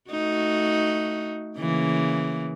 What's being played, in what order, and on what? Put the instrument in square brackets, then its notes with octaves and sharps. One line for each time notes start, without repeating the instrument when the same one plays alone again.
[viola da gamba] A3 D#4 F#4
C#3 E3 A#3